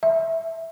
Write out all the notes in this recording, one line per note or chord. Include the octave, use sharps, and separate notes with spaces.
E5